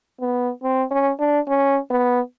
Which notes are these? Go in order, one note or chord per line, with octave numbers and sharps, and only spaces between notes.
B3
C4
C#4
D4
C#4
B3